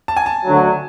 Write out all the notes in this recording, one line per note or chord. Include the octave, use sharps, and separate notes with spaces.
A5
G#5
A5
D2 D3 F#3